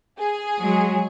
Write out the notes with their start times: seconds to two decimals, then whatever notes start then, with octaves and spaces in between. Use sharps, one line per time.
0.19 G#4
0.59 F#3 G#3